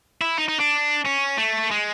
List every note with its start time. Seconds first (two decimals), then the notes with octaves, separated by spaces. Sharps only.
0.21 E4
0.38 D#4
0.48 D#4
0.60 D4
1.05 C#4
1.38 A3
1.71 G#3